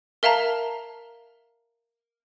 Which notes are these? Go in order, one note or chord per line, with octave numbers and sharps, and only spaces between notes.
A#4 E5 F5 A5 A#5